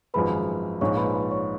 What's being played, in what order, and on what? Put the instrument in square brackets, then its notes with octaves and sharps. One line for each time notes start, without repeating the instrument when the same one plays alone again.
[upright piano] G#1 F#2 F3 G#3 [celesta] B4 B5
[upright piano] A#1 G#2 F3 [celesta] C#5 C#6
[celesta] B4 B5
B4 B5
C#5 C#6